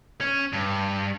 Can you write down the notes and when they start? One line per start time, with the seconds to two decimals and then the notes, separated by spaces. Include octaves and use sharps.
0.21 C#4
0.53 G2